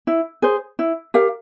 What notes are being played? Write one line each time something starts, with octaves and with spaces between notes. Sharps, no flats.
E4
G#4 C5
E4
G4 A#4 F5